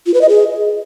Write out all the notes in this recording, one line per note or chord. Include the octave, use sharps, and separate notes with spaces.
F4
B4
D#5
G#4